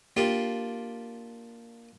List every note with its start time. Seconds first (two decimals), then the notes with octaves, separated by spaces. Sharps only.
0.17 A#3 D4 F4 G4